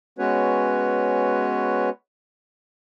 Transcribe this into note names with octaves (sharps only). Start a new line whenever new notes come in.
G#3 B3 C#4 F#4 B4 C#5